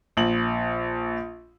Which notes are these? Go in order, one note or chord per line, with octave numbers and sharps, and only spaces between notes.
A#1 F#7